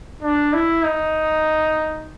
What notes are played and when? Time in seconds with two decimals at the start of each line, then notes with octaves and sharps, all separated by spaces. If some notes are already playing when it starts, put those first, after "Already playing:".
0.23 D4
0.53 E4
0.84 D#4